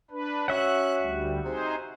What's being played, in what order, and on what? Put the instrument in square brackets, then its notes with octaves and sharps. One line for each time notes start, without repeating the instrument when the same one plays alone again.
[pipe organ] D4 B4
[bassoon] C#4 [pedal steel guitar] F#4 E5 F#5 [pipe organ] F#6
[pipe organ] D2 G3
[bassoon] C3 [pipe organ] D#4 G#4 C5